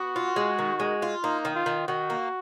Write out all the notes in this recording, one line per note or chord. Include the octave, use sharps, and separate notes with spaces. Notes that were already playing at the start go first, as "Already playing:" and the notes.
Already playing: B3 F#4
F4
G#3
D#3
G#3
F4
A#3 D#4
D#3
F4
D#3
D#3 F#4
A#3